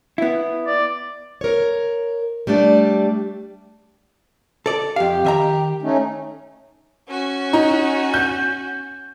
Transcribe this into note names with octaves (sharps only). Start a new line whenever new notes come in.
B3 E4
D5
A#4 C#5
G3 A3 D4 D5
A4 D5
F2 G4 F5
D#3 E5 A#5
A3 C#4 D#4
C#4 F#4
D#4
G6